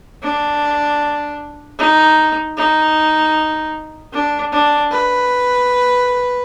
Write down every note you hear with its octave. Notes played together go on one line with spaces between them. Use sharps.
D4
D#4
D#4
D4
D4
B4